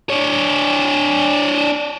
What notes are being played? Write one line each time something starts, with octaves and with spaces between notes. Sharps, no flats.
D4 C#5